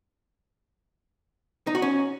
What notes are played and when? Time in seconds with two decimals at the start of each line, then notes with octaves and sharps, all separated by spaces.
1.67 D#4
1.75 F#4
1.82 C#4